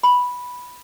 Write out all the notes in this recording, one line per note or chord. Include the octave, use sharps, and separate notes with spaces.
B5